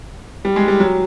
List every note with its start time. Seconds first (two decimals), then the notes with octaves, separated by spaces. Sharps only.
0.45 G3
0.56 G#3
0.68 G3
0.80 F#3